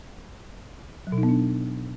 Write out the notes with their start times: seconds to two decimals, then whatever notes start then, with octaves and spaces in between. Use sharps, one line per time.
1.07 F#3
1.12 B2
1.18 D#4
1.23 B3
1.29 D4